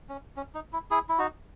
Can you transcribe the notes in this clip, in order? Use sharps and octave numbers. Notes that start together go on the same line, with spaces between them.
C#4
C#4
D#4
E4
E4 G#4
E4
D#4 F#4